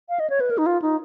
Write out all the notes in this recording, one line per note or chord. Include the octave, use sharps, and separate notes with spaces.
F5
D#5
C#5
B4
A#4
D#4
F4
D#4